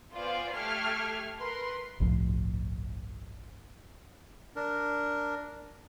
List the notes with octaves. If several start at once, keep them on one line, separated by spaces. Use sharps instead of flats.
B3 F4 C5 D5 F5 G#5
A3 G4 A4 F6 G#6 C7
A#4 B4 C6
G1 C2 A2 F3
D4 A#4